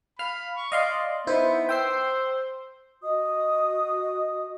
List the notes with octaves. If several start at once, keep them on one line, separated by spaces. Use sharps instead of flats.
F5 B5 F6
C#6
D5 D#5 F5 C6
B3 D#4 E4 C5
C5 G5 E6 C7
F#4 D#5 D#6